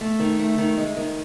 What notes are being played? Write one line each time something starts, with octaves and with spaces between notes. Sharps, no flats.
A3
D#3
A3
D#3
G#3
D#3